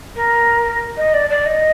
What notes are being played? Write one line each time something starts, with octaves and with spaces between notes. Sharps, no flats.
A#4
D#5
D5
D5
D#5